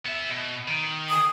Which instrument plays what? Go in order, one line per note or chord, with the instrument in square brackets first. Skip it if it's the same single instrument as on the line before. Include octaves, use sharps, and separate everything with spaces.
[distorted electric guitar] B3 E5
B2
D#3
[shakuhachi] D#6